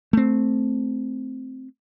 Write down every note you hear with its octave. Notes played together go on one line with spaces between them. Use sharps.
A3 C4